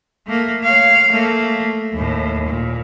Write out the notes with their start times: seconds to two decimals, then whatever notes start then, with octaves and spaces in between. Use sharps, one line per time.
0.27 A3 A#3
0.63 C#5 F5
1.12 A3 A#3
1.94 D#2 A2
2.48 A#2